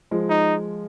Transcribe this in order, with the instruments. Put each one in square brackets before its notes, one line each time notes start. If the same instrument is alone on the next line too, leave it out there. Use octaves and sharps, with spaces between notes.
[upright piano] F3 G#3
[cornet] D#4